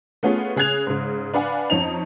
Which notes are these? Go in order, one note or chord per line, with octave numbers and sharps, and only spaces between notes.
A3 B3 C#4 F4 G#4
C#3 G#4 F#6 G#6 F7
G#2 C#3
D4 B4 F5 F#5 G#5
F2 C#4 D#4 F7